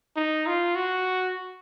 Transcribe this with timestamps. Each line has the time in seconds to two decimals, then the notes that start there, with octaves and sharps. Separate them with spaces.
0.16 D#4
0.46 F4
0.76 F#4